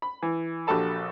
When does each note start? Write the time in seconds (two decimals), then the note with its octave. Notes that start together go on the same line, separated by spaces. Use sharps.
0.02 B5
0.23 E3
0.67 A#1 F#4 G4 A4 A5 B5